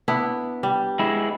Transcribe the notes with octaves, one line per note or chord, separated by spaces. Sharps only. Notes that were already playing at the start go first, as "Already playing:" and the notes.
B3 D4 E4
G3
G#3 E4